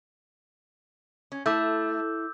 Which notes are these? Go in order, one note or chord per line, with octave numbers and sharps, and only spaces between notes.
C#4
A3 E4 A4 D6 E6 G6